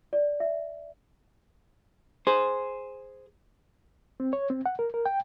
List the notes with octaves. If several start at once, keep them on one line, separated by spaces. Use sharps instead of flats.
D5
E5
G#4 C5
C4
C#5
C4
F#5
A#4
A#4
G5